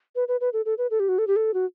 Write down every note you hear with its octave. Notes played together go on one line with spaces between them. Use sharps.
B4
B4
B4
A4
A4
B4
A4
G4
F#4
A4
G4
A4
F#4